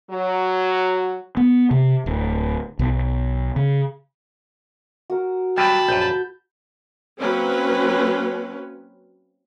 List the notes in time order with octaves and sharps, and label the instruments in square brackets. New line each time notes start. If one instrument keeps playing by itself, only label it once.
[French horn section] F#3
[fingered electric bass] B3
C3
D1
B1
C#3
[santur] F#4 A#4
[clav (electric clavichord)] F#3 G3 [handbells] G5 [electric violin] A5 B5
[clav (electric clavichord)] A#1 F#2 [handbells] G6
[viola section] F#3 A#3 C4 C#4 B4